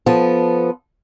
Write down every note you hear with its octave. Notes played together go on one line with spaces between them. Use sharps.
F3 B3 A4